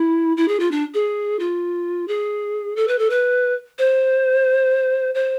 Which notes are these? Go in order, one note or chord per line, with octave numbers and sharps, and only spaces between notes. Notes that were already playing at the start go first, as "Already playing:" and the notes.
Already playing: E4
E4
G#4
F4
D4
G#4
F4
G#4
A4
B4
A4
B4
C5
C5